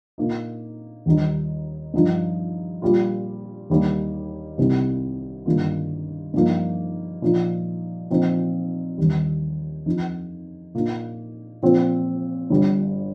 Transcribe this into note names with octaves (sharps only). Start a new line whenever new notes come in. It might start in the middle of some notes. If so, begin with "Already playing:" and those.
A#2 A#3 D#4
D#2 D#3 G3 D#4
G2 F3 D#4
A#2 G3 A#3 F4
D#2 D#3 G3 A#3 D#4
C2 C3 G3 D#4
G1 G2 D#3 A#3 F4
G2 F3 A#3 D#4
A#2 F3 D#4
A#2 F3 C4 D#4
D#2 D#3 G3
F2 F3 D#4
A#2 A#3 D#4
A#2 F3 C4
G1 G2 G3